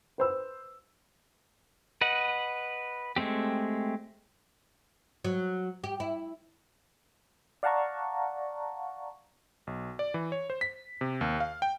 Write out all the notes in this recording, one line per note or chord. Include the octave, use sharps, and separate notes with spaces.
B4 C5 E6
B4 D#5 F#5
G#3 A3 C4 G4
F#3
G4
E4
D5 F5 F#5 A5 A#5 C#6
B1
D5
E3
C#5
C5
B6
C3
D#2
F5
G5